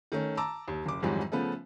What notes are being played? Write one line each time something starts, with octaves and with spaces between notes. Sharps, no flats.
D#3 A3 C#4
A5 A#5 D6 E6
D#2
F#1 D6
F2 G#2 D#3 E3 F#3 G3
C#3 F3 A3 B3